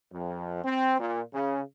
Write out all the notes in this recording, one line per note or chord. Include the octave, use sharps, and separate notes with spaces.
F2
C4
A#2
C#3